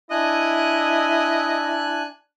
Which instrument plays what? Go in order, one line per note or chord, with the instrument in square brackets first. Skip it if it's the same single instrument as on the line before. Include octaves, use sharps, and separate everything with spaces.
[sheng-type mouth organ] D4 G#5 F#6 [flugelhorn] E4 [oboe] D#5